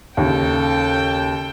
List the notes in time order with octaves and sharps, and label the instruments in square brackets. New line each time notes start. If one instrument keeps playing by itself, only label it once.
[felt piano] D#2 C#3 [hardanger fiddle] A4 G5